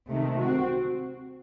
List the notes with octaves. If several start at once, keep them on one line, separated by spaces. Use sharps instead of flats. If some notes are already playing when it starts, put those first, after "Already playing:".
C3 D#3 A3
C4 F#4